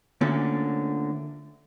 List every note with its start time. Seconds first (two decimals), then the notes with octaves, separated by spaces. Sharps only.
0.21 D2 A#2 D3 C#4